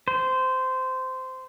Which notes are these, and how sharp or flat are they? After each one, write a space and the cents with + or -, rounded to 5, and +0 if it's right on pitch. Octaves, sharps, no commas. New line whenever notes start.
C5 -15